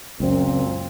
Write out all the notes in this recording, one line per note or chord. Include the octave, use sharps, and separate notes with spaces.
C#2 F#2 A#2 C4